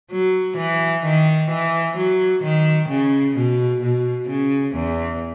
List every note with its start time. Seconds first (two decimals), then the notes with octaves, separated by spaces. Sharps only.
0.11 F#3
0.57 E3
1.04 D#3
1.50 E3
1.96 F#3
2.43 D#3
2.89 C#3
3.36 B2
3.82 B2
4.28 C#3
4.75 E2